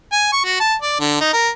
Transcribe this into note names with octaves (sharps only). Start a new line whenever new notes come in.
G#5
C#6
F#4
A5
D5
D3
D#4
A#4